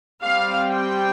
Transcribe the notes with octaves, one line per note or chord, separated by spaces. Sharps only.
G3 C4 F5
G5